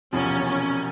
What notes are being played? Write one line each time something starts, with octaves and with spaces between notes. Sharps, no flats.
E1 E2 C3 F3 C#4
C#4